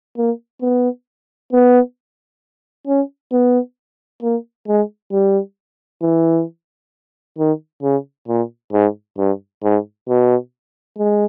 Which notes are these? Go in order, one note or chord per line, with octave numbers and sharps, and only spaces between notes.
A#3
B3
B3
C#4
B3
A#3
G#3
G3
E3
D#3
C#3
A#2
G#2
G2
G#2
B2
G#3